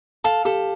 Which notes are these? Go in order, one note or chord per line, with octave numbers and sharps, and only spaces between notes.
A4 F5
G4 A4